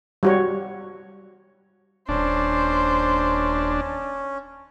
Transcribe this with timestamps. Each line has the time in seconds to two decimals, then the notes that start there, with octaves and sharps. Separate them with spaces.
0.23 G3 F#4 C#5
2.09 D#1 C#4 D4 C5